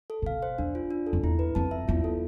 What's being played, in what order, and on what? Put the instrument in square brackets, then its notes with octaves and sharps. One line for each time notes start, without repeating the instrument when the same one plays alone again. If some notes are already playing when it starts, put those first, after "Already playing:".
[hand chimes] A4
[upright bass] A2
[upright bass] B2 [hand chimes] F5
[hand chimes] C5
[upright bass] E2 [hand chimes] D4
[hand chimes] F4
D4
A4
[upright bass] F2
[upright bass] E2 [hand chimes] E4
[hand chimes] B4
[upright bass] F2 [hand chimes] A5
[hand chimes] E5
[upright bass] E2 [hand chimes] F4
[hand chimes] A4